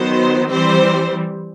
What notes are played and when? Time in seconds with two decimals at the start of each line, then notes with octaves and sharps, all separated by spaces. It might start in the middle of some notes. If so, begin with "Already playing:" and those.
Already playing: D#3 F#3 B3 C5
0.50 E3 G3 C4 C5